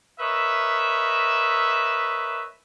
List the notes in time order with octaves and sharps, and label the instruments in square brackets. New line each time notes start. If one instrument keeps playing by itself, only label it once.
[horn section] A#4 B4 C#5 D#5 E5